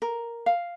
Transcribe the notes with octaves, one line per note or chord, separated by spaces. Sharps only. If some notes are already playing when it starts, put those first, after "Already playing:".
A#4
F5